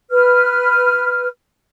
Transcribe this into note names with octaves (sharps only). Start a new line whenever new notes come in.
B4 F6